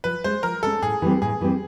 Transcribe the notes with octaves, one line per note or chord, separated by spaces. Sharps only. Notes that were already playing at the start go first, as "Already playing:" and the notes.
F3 B4
G#3 C#4 C5
F3 A#4
G#3 C#4 A4
A2 G#4
E3 G3 C4
A2 G#4
E3 G3 C4